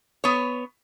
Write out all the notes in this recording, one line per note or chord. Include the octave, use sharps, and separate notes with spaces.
B3 C#5